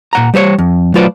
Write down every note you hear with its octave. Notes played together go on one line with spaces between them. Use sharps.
A#2 F#5 A#5
G3 G4 C5 C#5
F2
F#3 A3 F4 B4 C5 D5